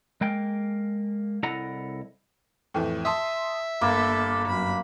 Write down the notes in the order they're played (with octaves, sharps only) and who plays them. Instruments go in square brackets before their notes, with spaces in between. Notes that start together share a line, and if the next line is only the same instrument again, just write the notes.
[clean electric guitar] G#3 A#3 G5
C2 E4 A4 D#5 F#5 A#5
[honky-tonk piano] F2 A2 E3
[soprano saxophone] E5 [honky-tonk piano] A5 C6 D#6
[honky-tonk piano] G1 [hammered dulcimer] A#3 [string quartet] A4 B5
[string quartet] F#2 B5